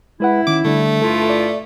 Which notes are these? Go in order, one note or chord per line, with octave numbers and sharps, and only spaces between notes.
G#3 E4 B4 F#5
D#3 C#4 D6
D3 G3 A3 D4
G2 E4 F4 A4
D5